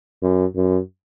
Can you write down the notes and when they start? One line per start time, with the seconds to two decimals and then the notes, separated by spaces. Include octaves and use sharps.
0.22 F#2
0.55 F#2